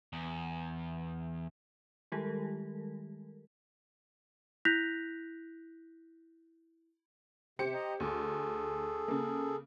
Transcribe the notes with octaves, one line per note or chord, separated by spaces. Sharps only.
E2
D#3 G3 G#3 G4 A4 A#4
E4 F#6 G6 A#6 B6 F7
C3 G4 C5 C#7
D#5 A#5
D2 G#4 A4
C#3 A#3